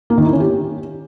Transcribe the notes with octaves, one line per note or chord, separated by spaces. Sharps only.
A#3
D#3
E4
C#4
G4